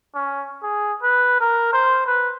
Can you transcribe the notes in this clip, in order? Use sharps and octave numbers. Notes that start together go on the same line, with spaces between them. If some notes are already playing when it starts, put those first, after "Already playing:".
C#4
G#4
B4
A#4
C5
B4